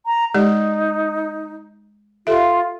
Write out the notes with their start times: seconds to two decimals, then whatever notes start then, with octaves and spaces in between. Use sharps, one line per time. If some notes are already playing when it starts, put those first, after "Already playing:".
0.06 A#5
0.34 G#3 D#4 G4 D5
2.27 F4 G4 A4 E5